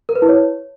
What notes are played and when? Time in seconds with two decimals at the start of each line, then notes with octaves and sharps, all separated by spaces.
0.09 A#4
0.15 B4
0.22 E4
0.29 C#5